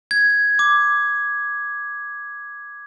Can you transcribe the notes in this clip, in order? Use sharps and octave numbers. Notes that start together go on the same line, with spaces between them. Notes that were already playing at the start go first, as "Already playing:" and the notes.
G#6
D6